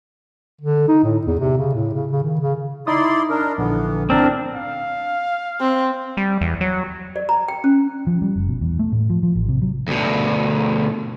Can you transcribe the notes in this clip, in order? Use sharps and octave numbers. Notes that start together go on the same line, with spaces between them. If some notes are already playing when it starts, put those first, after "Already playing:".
D3
D#4
A2
E2
C3
C#3
A2
C#3
C#3
D#3
C#3
D#4 E4 D5 C6 D#6
D4 A#4
A#1 D3 E3 B3
A2 C4 D4 A#4
F5
C4
G3
E2
F#3
D5
A#5
G5
C#4
F3
G3
F#1
B2
E2
A3
A2
F3
F3
A1
C3
F#3
D2 B2